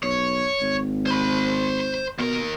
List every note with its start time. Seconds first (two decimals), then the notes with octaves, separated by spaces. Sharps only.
0.03 B1 C#5
0.61 G#1
1.06 C5 B5
2.19 D#2 B2 A#4